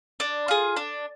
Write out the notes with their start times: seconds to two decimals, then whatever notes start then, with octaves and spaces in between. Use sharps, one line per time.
0.20 D4
0.48 F4 G#4
0.76 D4